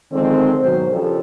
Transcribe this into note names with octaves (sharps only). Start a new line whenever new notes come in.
D3 D#3 F3 G#3 C4
G#2 B2 D#3 F#3 C5
C#3 F3 D4 G4 A4 A#4